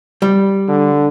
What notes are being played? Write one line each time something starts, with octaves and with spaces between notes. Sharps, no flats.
G3
D3